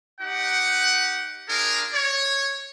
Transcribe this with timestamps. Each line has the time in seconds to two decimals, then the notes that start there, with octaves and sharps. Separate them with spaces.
0.21 D#4 G4 F#5
1.49 D4 F4 G#4 A#4
1.93 C#5